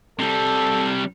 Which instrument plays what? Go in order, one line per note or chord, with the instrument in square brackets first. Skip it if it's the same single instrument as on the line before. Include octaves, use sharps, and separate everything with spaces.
[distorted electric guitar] C3 G3 [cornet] A4